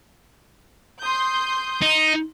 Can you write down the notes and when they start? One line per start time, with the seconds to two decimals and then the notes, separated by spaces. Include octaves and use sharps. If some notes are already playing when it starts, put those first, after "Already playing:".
1.01 C6 D#6 G6
1.82 D#4